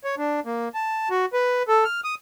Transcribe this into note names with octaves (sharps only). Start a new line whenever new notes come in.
C#5
D4
A#3
A5
F#4
B4
A4
F6
D#6